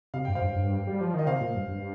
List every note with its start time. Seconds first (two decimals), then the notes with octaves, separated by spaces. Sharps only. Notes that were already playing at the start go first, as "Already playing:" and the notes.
0.14 C3 F5
0.25 G2 G5
0.35 C5 F5
0.42 G2
0.56 G2
0.87 G3
1.01 F3
1.14 D#3 D#5
1.26 C3 C5 F5
1.41 A#2
1.55 G2
1.69 G2